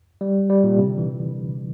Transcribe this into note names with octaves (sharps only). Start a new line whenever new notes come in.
G3
G3
A#2
C3
D3
E3